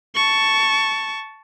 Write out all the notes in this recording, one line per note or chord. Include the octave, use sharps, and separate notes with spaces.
A5 C#6